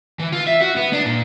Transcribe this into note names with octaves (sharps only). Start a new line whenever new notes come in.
E3
F4
E5
F#4
B3
D4
A#2